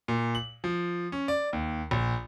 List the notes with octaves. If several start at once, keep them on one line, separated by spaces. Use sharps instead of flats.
A#2
F#7
F3
C#4
D5
D#2
A#1